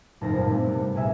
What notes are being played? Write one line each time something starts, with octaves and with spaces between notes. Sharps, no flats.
F#1 A#2 D#4 A4 C5 A#6
G2 A#2
A3 C4 D4
G2 C3 G3 B3
A#1 A#2 G#4 E5 G#5